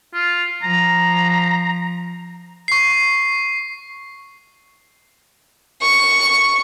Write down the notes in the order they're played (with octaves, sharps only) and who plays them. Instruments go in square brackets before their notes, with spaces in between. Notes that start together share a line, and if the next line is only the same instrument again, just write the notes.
[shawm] F4
[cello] F3 [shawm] A#5
[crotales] C#6 C7
[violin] C#6